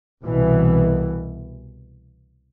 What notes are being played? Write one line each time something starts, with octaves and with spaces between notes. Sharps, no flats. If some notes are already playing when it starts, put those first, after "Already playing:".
C2 B2 E3